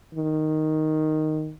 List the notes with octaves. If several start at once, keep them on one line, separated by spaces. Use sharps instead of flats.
D#3